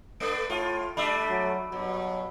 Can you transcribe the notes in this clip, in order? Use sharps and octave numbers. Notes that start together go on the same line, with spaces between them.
A3 B3 D4 D7
A2 F4
G3 A3 D4 B5 E6
F#3
G2 B2 F#3